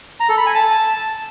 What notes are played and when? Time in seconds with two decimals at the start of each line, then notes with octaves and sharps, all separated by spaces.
0.20 A#5
0.29 A4
0.38 B5
0.46 G#5
0.55 A5